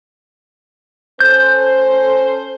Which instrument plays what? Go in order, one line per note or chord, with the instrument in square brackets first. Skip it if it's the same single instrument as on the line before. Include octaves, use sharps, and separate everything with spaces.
[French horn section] C#4 A4 C5 [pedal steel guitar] G6